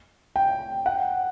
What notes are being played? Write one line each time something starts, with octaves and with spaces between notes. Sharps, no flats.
G5
F#5